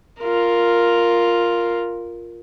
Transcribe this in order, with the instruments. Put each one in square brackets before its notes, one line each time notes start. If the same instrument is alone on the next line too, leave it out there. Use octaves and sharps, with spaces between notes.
[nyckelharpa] F4 A#4